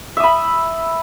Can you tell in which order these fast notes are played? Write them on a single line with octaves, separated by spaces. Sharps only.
E5 D#6 B5